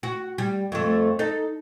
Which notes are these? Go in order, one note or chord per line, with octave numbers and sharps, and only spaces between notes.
F#4
G3
F2 A3
D#4 A4